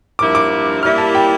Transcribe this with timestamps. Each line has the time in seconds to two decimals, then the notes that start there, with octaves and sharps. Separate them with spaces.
0.19 G2 F3 A#3 E4 A#4 D6
0.35 D6
0.82 G3 A#3 E4 F6
0.98 A5
1.15 G5